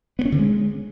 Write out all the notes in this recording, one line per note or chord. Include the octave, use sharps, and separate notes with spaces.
B3
C#4
D3
G#3